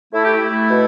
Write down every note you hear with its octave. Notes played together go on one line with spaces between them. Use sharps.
A3 E4
G4
E4
A3
B2